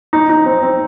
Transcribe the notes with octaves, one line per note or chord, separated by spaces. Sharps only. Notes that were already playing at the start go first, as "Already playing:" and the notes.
D#4
D#4
C4
C4